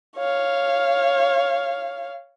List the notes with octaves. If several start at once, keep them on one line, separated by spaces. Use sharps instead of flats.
C#5 F5